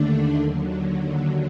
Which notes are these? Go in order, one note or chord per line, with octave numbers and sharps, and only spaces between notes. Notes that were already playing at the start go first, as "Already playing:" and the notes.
Already playing: D#2 D3 A3 D4
D#2 D3 F#3